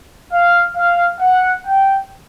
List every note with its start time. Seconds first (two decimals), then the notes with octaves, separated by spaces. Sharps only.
0.32 F5
0.76 F5
1.20 F#5
1.65 G5